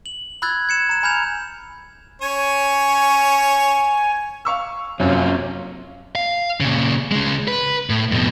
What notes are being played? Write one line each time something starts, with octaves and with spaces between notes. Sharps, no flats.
F#7
B5 E6 F#6 G#6 A6
G#6 C#7 E7
A#5 E7
G#5 B5 F6 G6 G#6 F7
C#4 C#5 G#5
F5 C#6 E6
F#1 F#2 C3 F#3 C4 C#4 F4
F5
A#2 C#3
C#3 G#3
B4
A2
F2 B2